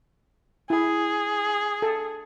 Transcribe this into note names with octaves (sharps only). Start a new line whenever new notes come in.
E4 G#4
A4